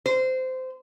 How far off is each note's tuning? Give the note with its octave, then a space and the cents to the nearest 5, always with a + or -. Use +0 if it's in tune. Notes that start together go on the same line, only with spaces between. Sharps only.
C5 -20